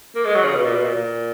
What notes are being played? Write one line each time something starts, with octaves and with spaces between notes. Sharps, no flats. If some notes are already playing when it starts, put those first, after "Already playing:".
A#3
G#3
F#3
C#3
B2
A#2
B2
A#2
A#2